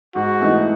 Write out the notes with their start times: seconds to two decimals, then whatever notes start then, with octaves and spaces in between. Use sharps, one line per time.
0.15 G#2 F#4
0.40 E3 A3 D#4